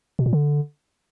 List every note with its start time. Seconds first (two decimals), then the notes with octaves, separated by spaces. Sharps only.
0.19 B2
0.26 A#2
0.33 D3